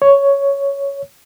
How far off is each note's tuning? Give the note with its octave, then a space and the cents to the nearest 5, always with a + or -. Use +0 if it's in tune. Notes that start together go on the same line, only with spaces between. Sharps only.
C#5 +5